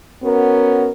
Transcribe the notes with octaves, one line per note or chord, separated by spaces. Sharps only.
B3 C#4 F#4 A#4